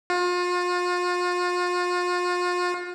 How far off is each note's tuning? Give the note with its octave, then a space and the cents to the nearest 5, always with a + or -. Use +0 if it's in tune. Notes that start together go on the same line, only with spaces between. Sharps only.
F4 +35